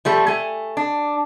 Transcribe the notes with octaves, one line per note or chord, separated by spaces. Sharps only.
F3 G3 A3
A3 G#5
D4